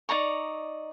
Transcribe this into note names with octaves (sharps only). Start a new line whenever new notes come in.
D#4 D5 A#5 C#6